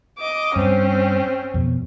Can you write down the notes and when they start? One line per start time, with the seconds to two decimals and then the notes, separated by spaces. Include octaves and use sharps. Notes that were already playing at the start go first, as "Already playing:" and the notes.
0.19 D#5 D6
0.56 G2 C4 C#4
1.54 F2 B2